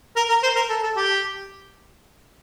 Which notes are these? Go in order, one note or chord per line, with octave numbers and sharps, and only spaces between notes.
A#4
A#4
C5
A#4
A4
A4
G4